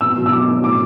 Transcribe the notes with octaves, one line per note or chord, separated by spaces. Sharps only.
B2 E6
F#3
E6
F#3 D6
F#3
A2 D6